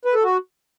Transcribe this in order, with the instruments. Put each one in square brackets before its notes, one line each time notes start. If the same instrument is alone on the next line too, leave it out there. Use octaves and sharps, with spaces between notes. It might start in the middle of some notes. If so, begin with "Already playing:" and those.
[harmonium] B4
A4
F#4